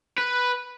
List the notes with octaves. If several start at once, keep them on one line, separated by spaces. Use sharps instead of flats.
B4